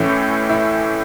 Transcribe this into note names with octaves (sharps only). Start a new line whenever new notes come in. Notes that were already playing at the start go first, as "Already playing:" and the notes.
Already playing: A2 E3 A3 C#4 E4
E4